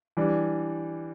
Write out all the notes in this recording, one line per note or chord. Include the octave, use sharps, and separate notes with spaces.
E3 G3 D4